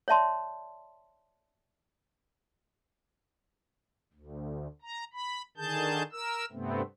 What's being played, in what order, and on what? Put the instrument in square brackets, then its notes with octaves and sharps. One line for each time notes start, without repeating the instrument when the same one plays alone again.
[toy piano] C#5 D5 E5 A5 C6
[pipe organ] D2
A#5
B5
D3 D#3 G#4 A5 G6
A#4 E6
G2 C3 A3 B3 C4